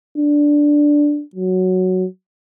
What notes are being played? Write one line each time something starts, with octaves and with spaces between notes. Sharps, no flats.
D4
F#3